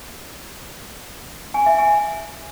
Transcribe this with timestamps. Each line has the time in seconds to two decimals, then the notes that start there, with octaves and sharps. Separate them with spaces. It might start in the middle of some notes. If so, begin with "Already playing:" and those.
1.54 G#5
1.66 E5
1.78 G#5